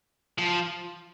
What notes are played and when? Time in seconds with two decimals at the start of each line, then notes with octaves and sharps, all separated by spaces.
0.38 F3